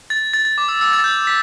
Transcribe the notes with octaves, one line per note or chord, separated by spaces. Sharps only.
A6
A6
A6
D6
E6
E6
A6
G6
B6